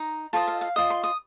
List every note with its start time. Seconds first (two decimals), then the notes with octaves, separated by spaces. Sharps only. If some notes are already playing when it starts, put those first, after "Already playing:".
Already playing: D#4 A#5
0.33 F4 A4 C5 D#5 A5
0.48 F5
0.61 F5
0.76 F4 C5 D#5 D#6
0.90 C6
1.04 D#6